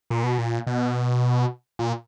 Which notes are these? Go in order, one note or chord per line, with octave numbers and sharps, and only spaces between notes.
A#2
B2
A#2
B2
A#2